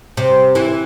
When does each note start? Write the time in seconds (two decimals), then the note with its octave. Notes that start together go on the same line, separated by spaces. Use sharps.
0.17 C3
0.55 E3